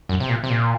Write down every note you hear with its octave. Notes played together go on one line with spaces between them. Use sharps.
F#2
C3
A#2
C3
A#2